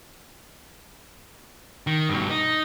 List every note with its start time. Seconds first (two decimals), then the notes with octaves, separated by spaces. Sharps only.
1.87 D#3
2.09 G2 B2
2.30 D#4